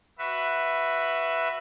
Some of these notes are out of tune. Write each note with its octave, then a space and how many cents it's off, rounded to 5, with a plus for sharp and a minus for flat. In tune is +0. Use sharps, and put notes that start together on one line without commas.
F#4 +0 B4 +0 E5 +10